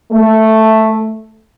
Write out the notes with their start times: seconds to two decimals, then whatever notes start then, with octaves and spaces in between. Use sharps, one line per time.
0.12 A3